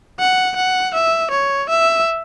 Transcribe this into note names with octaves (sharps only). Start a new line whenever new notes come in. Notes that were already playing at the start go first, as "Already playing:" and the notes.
F#5
F#5
E5
C#5
E5